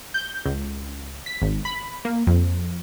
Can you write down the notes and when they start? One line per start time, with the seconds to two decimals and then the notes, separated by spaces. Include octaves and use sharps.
0.14 G6
0.45 C#2
1.26 B6
1.42 G#1
1.65 B5
2.05 A#3
2.27 F2